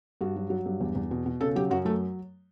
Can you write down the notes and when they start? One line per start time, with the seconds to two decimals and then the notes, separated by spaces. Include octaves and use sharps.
0.21 G2 F#4
0.36 F#3
0.50 F#3
0.66 G2
0.80 E2
0.95 E2
1.11 B2
1.26 B2
1.41 C#3 A4
1.56 F#3 G4
1.70 F#2 F#4
1.85 F#3 A3